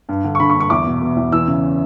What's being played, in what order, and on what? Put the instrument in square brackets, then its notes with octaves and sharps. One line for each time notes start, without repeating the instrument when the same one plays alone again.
[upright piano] G2
D3
C#6
D3 B5
C#6
G2
C#6
E2 D6
B2
B2
E2
E3 E6
C#3